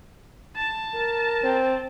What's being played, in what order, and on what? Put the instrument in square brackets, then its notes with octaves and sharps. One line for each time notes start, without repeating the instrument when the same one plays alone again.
[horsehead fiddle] A5
[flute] A#4
[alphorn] C4